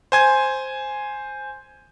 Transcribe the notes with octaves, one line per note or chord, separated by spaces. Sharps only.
C5 G#5 G#6